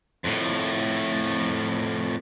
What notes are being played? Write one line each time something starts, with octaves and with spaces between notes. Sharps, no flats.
F2 A2